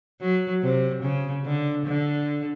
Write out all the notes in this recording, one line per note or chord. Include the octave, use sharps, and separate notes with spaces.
F#3
C3
C#3
D3
D3